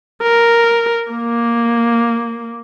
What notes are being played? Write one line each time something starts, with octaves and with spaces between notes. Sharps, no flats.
A#4
A#3